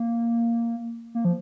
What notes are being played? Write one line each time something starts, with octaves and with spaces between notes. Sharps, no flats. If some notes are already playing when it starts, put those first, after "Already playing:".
Already playing: A#3
A#3
F3